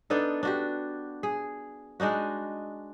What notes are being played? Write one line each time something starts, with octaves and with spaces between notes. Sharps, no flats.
B3 D4 D#4 A4
D4 F#4 G4
G#4
G#3 D4 D#4 F#4